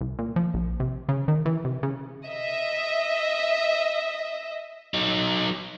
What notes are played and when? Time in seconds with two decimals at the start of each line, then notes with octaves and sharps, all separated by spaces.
0.01 C2
0.19 A#2
0.36 F3
0.54 A#1
0.80 C3
1.09 C#3
1.28 D#3
1.46 E3
1.65 C3
1.83 C#3
2.28 D#5 E5
4.94 F#3 D#4